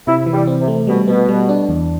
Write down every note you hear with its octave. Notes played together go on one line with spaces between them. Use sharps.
C3 E4
E3
G3
C4
C3
A3
B2 G3
B2 B3
G3
D4
E2